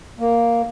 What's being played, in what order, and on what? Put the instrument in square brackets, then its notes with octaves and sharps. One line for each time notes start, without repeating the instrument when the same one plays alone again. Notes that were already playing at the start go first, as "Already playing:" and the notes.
[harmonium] A#3